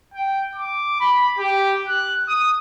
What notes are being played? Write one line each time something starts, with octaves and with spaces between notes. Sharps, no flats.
G5
D6
B5
G4
F#6
D#6